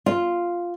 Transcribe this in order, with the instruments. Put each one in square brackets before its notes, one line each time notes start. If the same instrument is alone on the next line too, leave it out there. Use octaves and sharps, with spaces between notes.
[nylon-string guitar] F4